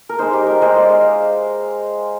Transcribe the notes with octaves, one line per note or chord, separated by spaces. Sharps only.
A#4
G#3 D#4 C5
G4
A#4
G#3 D#4 C5
D5
F5